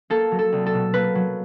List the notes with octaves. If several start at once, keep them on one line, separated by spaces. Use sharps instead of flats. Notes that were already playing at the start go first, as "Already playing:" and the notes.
A#3 A4
F#3
A4
C2
A4
B2
A#3 B4
F#3